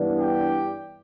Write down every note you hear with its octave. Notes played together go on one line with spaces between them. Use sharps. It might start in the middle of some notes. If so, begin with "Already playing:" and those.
Already playing: G2 E3 B3 D4
G4